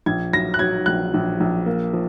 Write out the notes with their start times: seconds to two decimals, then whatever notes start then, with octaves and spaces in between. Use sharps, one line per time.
0.06 A#1 G#6
0.33 F#3 A#6
0.54 F#6
0.59 F#3 G#6
0.86 A#1 F#6
1.14 A#1
1.40 A#1
1.66 A#3
1.93 F3